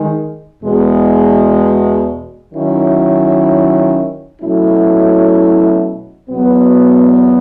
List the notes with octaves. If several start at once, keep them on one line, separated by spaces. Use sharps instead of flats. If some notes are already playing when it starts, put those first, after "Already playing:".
Already playing: D#3 G#3
E2 B2 G#3
D#3 F#3 C#4 E4
B2 F#3 A3 C#4 E4
E2 B2 F#3 B3